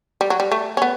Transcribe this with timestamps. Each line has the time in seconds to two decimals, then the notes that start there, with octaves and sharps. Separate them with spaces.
0.21 G3
0.30 F#3
0.40 G3
0.52 A3
0.77 C#4
0.82 B3